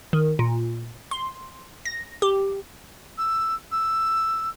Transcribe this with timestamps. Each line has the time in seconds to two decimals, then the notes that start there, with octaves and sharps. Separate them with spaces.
0.13 D#3
0.39 A#2
1.11 C6
1.85 A#6
2.22 G4
3.18 E6
3.71 E6